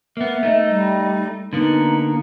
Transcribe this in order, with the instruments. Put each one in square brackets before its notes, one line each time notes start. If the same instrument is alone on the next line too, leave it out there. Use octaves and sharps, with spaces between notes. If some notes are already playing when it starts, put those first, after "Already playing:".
[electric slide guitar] A#3 B3 [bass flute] E5
[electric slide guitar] A3 D#4
[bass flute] G3
[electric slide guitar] D3 A#3 B3 [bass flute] D#4